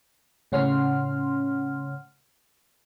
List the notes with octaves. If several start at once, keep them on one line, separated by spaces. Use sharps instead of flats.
A2 C#3 C#4 F#5 C6 F6